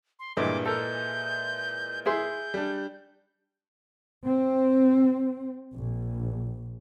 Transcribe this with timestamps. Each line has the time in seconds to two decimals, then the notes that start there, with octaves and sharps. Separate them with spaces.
0.19 C6
0.37 G2 A#2 E3 G#3 D6
0.66 A4 A#4 G6
2.06 E4 G#4 C6 G6
2.54 G3 D4
4.24 C4
5.73 A#1